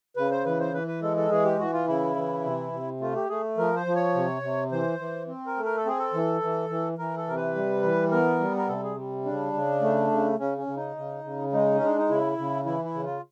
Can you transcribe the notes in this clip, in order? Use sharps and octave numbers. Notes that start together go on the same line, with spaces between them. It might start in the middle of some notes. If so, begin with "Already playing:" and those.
C#3 B4
C5
E3 B4
C5
E3 B4
B4
G#3 A4
A4
E3 G#4
G4
E3 F#4
F4
C#3 E4
E3
C3
C3
A3 F4
G4
A3 G#4
F3 A#4
C5
F3
C#5
C3
C3
E3 C5
E3
C4
A#4
A3
A#4
A4
C4 G#4
A4
E3
E3
E3
E3 A#4
A4
C3 A#4
B4
G3
E3
B3 A#4
G3
A#4
C3 A4
G#4
G3
C#3 D4
C#3
A3
C#3
C#3 C#4
C#4
C#3
D#4
C#3
C#3
G#3 D#4
C#4
G#3
D4
D#4
C#3 E4
C#3
E3 E4
E4
C#3
F4